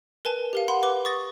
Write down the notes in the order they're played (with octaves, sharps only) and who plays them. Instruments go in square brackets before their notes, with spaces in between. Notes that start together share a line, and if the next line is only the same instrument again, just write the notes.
[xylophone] A#4 B4 G#5 A5
G4 A#4 F5
F#5 B5 C6
B4 D6 G7
C#6 D#6 A6 A#6